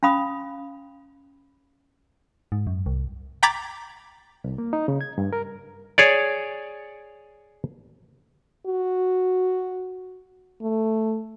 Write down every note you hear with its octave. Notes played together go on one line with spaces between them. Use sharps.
C#4 F5 B5 D#6
G#2
F#2
C2
G5 A#5 B5 D6 G#6 A6
C2
A#3
D#4
C#3
G#6
G2
A#4
G#4 C#5 D5
F#4
A3